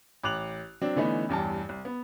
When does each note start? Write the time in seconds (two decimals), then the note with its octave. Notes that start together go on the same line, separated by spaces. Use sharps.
0.24 A1 D6 F#6 F7 F#7
0.81 F#3 C4 D4
0.96 D3 E3 A3 B3 C#4 D#4
1.29 A1 E2 G2 A5
1.69 C2
1.85 B3